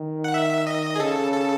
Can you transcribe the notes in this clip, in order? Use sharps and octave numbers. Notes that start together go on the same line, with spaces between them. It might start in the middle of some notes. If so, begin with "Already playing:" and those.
Already playing: D#3
F#5
E5
D#5
G#4
C#3 A4
A4